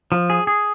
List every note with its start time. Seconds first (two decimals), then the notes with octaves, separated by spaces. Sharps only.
0.12 F3
0.30 G#4
0.47 G#4